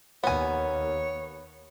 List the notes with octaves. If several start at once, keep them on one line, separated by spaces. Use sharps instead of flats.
D#2 B3 C#5 G#5